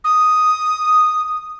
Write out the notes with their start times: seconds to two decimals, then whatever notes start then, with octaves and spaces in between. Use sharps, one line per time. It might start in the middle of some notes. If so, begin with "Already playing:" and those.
0.04 D#6